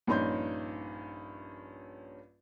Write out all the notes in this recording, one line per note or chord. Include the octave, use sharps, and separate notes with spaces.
A#1 G2 C#4 D#4 C6 G6